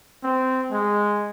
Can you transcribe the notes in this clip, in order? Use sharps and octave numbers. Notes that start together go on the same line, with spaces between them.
C4
G#3